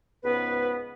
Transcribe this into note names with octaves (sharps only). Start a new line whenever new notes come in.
C#2 G#2 B3 B4